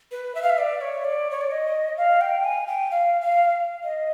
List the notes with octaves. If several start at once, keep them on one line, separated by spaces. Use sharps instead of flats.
B4
E5
F5
E5
D5
C#5
D5
C#5
D5
D#5
F5
G5
G#5
G5
F5
F5
D#5